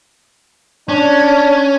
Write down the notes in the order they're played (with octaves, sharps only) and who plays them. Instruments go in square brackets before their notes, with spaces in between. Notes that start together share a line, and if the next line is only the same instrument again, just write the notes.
[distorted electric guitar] C#4 [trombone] D4